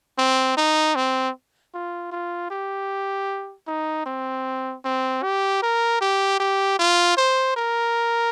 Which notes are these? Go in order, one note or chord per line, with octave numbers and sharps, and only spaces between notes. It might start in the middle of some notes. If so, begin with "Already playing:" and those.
C4
D#4
C4
F4
F4
G4
D#4
C4
C4
G4
A#4
G4
G4
F4
C5
A#4